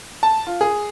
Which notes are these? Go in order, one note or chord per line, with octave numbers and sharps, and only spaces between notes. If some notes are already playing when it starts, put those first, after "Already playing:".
A5
F4
G#4